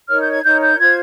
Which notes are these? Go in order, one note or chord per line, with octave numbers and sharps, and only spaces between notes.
D#4 A#4 C#5 F6
G6
G#6
D#4 A#4 C#5 G6
G6
F4 C5 G#6